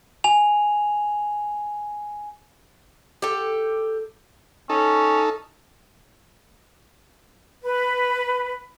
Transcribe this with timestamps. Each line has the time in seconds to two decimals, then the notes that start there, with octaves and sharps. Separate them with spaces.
0.24 G#5 F7
3.22 G4 A4
4.69 C#4 D#4 A4
7.63 B4